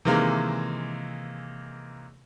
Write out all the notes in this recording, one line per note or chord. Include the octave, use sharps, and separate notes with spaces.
C3 D#3 E3 G#3 A#3